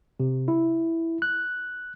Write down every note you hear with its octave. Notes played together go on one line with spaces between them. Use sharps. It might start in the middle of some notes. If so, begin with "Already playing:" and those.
C3
E4
F#6